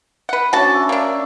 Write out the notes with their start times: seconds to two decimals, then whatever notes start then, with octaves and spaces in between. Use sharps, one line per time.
0.29 B4 F#5
0.53 C#4 D4 F#4 A5
0.74 E5
0.89 A#3 D4